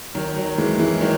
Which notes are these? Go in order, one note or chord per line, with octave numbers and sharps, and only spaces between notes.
D#3 F#3
D#3 F#3
E3 G#3
E3 G#3
D#3 F#3